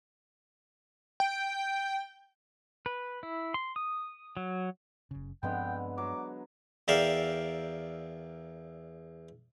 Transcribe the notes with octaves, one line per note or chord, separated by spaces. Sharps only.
G5
B4
E4
C6
D#6
F#3
F#1 C#3
G2 D3 F3 G#3 B3 C4 G5
F#3 D6
E2 A#4 D5 E5 F5 G5